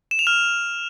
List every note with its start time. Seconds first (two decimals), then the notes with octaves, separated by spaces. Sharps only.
0.11 E7
0.19 F7
0.27 F6